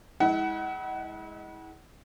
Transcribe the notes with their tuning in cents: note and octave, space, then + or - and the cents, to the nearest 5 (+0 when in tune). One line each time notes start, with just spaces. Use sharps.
G#3 +0 E4 -30 F#5 +25